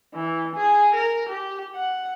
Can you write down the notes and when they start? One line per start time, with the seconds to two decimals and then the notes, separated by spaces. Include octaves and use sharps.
0.14 E3
0.56 G#4
0.95 A#4
1.29 G4
1.75 F#5